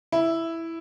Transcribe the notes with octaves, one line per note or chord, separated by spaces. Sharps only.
E4